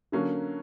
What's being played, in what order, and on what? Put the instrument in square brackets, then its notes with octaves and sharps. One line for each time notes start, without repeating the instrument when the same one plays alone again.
[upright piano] D3 F#3 A#3 C#4